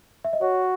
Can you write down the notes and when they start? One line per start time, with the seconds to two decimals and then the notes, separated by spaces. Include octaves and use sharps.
0.24 E5
0.33 D#5
0.41 F#4 C#5